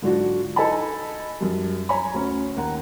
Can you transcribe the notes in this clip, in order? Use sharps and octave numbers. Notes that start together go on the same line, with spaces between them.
G#2 D3 F#3 D4 F4 F#4
D#4 A4 D#5 G#5 A5 B5
F#2 G3
C#5 G#5 A#5 B5
D2 C#4
D#2 F#5 A#5